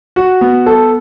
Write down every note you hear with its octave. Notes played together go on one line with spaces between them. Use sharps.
F#4
B3
A4